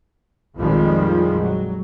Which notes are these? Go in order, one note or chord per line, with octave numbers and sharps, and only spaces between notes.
A#1 F2 D#3 F3 G3 G#3
F#3